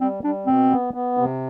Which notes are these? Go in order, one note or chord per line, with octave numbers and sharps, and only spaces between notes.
G3 C4
G3 D4
B2 C4
B3
B3
C3